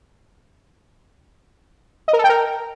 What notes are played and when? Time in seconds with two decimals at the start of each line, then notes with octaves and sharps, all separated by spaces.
2.08 D#5
2.13 A#4
2.19 A4
2.24 G5
2.29 A#4